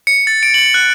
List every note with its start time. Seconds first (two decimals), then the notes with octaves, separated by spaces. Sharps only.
0.07 C#7
0.27 A6
0.43 D7
0.54 F#7
0.74 F#6